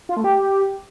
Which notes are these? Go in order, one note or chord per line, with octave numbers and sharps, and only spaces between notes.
F4
A3
G4